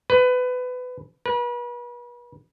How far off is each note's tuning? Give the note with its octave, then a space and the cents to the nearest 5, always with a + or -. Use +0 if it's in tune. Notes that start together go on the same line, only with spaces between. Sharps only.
B4 +20
B4 -40